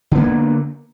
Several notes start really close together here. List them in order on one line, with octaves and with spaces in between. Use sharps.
D3 B3 A#3